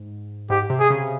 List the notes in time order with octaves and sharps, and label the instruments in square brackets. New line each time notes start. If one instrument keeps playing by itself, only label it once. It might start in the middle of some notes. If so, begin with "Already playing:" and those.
Already playing: [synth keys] G#2
[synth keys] G#2 [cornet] G4
[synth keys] C3
[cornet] G#4
[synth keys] C#3